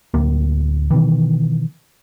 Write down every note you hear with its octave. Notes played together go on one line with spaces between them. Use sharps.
D1 D2 A#3
B2 D#3 E3